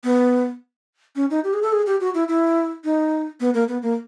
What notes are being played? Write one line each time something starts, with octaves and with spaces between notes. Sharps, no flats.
B3
C#4
D#4
G4
G#4
A4
G#4
G4
F#4
E4
E4
D#4
B3
A#3
B3
A#3